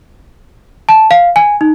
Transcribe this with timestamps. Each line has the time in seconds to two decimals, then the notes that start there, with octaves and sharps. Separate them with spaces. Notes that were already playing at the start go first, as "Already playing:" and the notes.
0.89 A5
1.11 F5
1.36 G#5
1.61 D#4